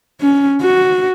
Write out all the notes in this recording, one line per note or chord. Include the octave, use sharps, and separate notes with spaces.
C#4
F#4